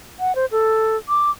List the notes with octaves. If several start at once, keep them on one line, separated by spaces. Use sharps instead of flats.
F#5
C5
A4
D6